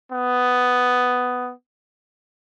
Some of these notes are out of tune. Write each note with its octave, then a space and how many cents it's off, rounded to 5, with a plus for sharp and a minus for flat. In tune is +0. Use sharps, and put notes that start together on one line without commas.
B3 +10